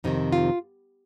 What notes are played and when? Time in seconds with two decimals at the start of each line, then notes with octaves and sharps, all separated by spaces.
0.04 F2 C3 D#3 D#4
0.33 F4